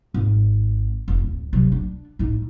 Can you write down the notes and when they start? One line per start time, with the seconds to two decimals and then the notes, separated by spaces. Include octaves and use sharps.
0.14 G#1
1.08 F1
1.24 D1
1.53 C3 F#3
1.72 D4
2.19 A2 D#4